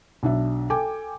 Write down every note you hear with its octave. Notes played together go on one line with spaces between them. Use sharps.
B1 D4 E5
A4 G5 G#5 D6